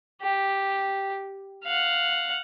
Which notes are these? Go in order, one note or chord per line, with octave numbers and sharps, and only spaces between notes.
G4
F5 F#5